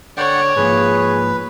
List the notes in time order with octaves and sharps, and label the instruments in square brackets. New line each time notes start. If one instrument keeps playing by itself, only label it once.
[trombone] D3 [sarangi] C#5 [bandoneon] D5 F#5 G5
[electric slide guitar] G#2 F3 A#3 [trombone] G#4 [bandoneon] B4